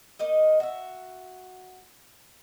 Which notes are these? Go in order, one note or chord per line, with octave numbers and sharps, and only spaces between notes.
A#3 D#4 D#5
F#4 E5